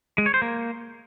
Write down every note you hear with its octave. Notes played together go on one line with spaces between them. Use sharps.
G#3
C#5
C5
A#3